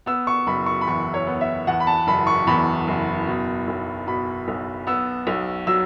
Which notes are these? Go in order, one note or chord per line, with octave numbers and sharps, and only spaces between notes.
B3 E6
C#6
F#1 B5
C#6
B5
E2 C#6
C#5
B3
E5
E2 F#5
B5
A5
F#1 B5
C#6
E2 B5
F#1
B2
B1
B2 B5
B1
B3 E6
B1
F#3 E6